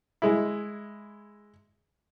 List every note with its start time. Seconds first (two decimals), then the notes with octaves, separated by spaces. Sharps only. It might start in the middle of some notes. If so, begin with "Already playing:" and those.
0.22 G#3 E4